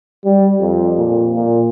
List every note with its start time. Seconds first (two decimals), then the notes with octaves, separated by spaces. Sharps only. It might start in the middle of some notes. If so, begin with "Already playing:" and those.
0.25 G3
0.61 F2
0.97 A#2
1.34 A#2